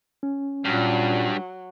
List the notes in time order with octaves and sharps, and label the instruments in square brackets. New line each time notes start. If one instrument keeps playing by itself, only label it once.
[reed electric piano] C#4
[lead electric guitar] G2 [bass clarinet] A#2 [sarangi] F#3